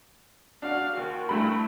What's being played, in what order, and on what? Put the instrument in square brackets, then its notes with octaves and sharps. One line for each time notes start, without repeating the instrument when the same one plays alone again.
[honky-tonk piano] D4 F#4 [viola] F5
[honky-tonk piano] D#2 [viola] F#4
[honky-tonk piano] G2 B5 [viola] A3 E4